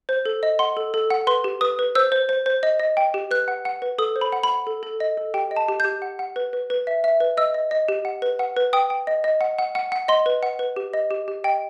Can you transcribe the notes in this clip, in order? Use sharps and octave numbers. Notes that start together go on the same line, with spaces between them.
C5
A4
D#5
F#5 C6
A4
A4
F#5
B4 C6
G4
B4 D#6
B4
C5 E6
C5
C5
C5
D#5
D#5
G5
G4
B4 F#6
F#5
F#5
B4
A4 D#6
C5
B5
F#5
B5
F#5
A4
A4
D#5
A4
G4 G5
D#5
A5
G4
G6
G4
F#5
F#5
B4
B4
B4
E5
E5
B4
D#5 E6
D#5
D#5
G4
F#5
B4
F#5
B4
G5 D#6
G5
D#5
D#5
F#5
F#5
F#5
F#5
D#5 C6
B4
F#5
B4
G4
D#5
G4
G4
D#5 G5